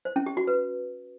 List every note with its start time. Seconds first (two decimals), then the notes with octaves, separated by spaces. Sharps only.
0.05 C5
0.16 C#4
0.26 G4
0.37 F#4
0.47 B4